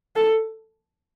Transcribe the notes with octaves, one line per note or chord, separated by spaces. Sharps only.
A4